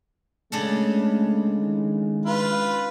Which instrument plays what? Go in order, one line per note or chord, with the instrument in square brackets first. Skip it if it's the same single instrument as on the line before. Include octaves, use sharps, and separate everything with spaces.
[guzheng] C#3 D4 A4 [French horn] G#3 [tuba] A3
[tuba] D#3
[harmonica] F4 B4